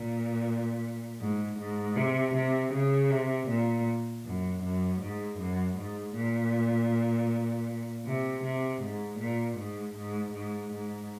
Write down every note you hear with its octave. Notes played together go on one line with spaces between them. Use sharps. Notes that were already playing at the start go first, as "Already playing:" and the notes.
Already playing: A#2
G#2
G#2
C3
C3
C#3
C3
A#2
F#2
F#2
G#2
F#2
G#2
A#2
C3
C3
G#2
A#2
G#2
G#2
G#2
G#2